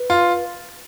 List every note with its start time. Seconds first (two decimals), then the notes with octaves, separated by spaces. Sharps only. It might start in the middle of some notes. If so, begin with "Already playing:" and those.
Already playing: B4
0.10 F4